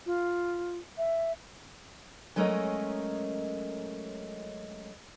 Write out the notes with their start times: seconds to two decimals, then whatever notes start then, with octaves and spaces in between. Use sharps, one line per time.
0.06 F4
0.98 E5
2.36 F#3 G#3 A3 C#4 A#4 D#5